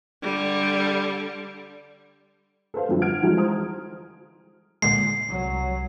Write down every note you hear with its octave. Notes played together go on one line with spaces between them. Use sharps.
D3 G3
A4 B4 C5 F5
F#2 D3 F3 G3
F#5 F6 G#6 D7
E3 F3 G3 G#3 D#4 F4
C5 A#5 D#6
A#2 D3 G#3 C7
C2 F#3